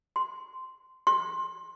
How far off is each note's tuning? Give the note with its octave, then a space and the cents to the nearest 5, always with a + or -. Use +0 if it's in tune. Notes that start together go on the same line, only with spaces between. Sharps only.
C6 -10
C6 +20